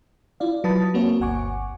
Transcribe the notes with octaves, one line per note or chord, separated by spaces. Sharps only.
E4 F4 D5 F5
F#3 B4 A5 B5 D#6 A6
A#3 C4 F#4 A#4 C#5 E5
G1 D2 F#5 G#5 C#6 D6